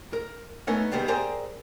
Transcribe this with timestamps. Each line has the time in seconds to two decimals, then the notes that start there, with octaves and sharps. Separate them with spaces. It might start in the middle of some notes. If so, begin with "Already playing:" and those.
0.13 A#4
0.67 A3 B3 C#4 D#4 A4 A#4
0.91 D#2 C3 G3 G#3 B3
1.08 G4 G#4 A#4 C5 D5 E5